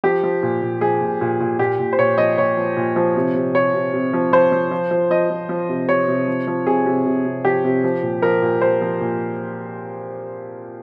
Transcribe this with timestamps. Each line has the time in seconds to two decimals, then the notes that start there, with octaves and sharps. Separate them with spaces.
0.04 F3 G4
0.23 F3
0.43 A#2
0.62 A#2
0.81 F3 G#4
1.01 A#2
1.21 A#2
1.40 A#2
1.59 A#2 G4
1.79 A#2
1.93 C5
1.98 A#2 C#5
2.18 F3 D#5
2.37 A#2 C#5
2.57 F3
2.77 A#2
2.96 F3
3.16 C3
3.35 C3
3.54 C3 C#5
3.74 C3
3.93 C3
4.13 F3
4.33 F3 C5
4.52 F3
4.71 F3
4.91 F3
5.10 F3 D#5
5.30 F3
5.49 F3
5.69 C3
5.89 C3 C#5
6.08 C3
6.28 F3
6.47 F3
6.67 C3 G#4
6.86 C3
7.06 C3
7.25 C3
7.45 F3 G4
7.64 C3
7.84 F3
8.03 A#2
8.22 F3 A#4
8.42 A#2
8.61 F3 C5
8.81 F3
9.01 A#2